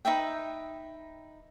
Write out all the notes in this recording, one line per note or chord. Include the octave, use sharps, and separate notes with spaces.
D#4 B4 E5 G5